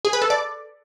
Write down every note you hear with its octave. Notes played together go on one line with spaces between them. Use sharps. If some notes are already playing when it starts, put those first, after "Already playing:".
G#4
B4
A4
D5